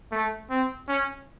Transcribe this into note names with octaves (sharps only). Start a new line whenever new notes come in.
A3
C4
C#4